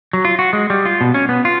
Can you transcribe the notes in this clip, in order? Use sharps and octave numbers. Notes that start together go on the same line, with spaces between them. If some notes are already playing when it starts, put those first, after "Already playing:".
F#3
F4
F#4
G#3
G3
F4
B2
C#4
B3
F4